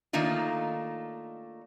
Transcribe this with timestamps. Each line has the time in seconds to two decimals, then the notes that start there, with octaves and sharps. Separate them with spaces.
0.13 D#3 A3 A#3 D4 D#4 F4